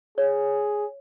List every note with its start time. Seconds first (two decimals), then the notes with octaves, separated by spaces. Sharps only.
0.18 G#4 C#5